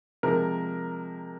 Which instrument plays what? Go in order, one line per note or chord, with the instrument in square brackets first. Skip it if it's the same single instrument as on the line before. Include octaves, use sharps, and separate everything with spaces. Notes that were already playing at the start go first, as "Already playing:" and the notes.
[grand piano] C3 F3 G#3 A#4